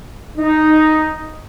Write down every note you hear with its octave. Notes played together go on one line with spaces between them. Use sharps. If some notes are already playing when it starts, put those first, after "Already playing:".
D#4